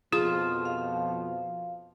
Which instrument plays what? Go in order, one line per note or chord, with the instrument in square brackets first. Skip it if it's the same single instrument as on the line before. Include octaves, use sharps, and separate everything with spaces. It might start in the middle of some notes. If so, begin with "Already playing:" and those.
[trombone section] F2 B2 F3 [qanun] F4 [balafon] G#4
[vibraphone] F5